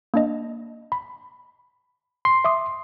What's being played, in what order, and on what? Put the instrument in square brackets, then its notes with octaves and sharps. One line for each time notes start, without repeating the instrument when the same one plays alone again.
[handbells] A#3 D4 D#5
B5
[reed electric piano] C6
[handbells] E5 D6 D#6